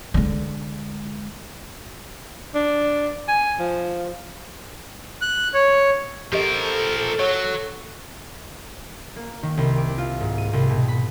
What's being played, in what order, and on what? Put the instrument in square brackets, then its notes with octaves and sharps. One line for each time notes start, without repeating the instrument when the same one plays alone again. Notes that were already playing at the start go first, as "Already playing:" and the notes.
[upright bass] D3 G#3
[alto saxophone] D4
G#5
F3
[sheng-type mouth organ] F#6
C#5
[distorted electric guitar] F3 A#4 [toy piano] G4 D#5 [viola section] A4
[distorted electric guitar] F#3 [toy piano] C#5
[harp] A#3
D#3
C2
D6
F4
G#2
D#7
C2
B2
B5